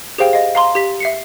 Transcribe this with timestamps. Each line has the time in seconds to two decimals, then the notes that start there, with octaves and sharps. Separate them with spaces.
0.18 G4 G#4 C5 F5 G5
0.33 D#5 F5
0.55 F5 A#5 C6
0.75 G4 B6
1.00 E5 C7 C#7